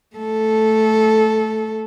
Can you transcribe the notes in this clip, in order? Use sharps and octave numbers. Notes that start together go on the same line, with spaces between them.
A3 A4